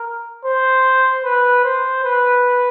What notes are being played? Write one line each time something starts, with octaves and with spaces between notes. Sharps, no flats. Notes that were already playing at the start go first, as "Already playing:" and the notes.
Already playing: A#4
C5
B4
C5
B4